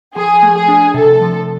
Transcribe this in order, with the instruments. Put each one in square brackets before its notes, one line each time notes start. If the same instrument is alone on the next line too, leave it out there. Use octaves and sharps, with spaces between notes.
[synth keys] F3 [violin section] G#4
[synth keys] A3
[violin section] G#4
[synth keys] D4
[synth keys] C3 [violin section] A4
[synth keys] F3